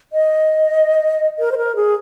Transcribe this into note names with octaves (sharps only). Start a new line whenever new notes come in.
D#5
A#4
C5
A#4
G#4